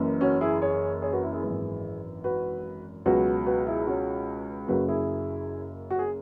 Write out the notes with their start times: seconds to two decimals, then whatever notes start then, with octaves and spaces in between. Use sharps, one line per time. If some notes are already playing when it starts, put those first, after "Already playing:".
Already playing: F#1 F#2 E3
0.21 C#4 F#4
0.41 E4 G#4
0.62 G#4 C#5
1.02 G#4 C#5
1.12 F#4 B4
1.23 E4
1.33 E4 G#4
1.43 G#1 F#2 E3
2.24 F#4 B4
3.06 C#2 B2 F#3 F#4 B4
3.46 F#4 B4
3.67 E4 G#4
3.87 C#4 F#4
4.68 F#1 F#2 C#3 F#3 F#4 B4
4.89 E4 G#4
5.91 F#4
5.99 G#4